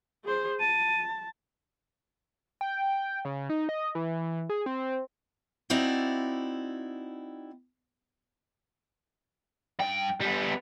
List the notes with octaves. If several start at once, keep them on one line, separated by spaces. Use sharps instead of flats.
G#4 C5
A5 D#7
G5
C#3
D#4
D#5
E3
G#4
C4
C4 D#4 E4 F#4 D5
G2 G5
G3 B3